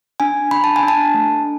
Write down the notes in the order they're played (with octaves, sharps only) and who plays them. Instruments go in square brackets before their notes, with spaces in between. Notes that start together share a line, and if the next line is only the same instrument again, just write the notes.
[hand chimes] D4 G#5
D4 B5
A5
G#5
D4
A5
A3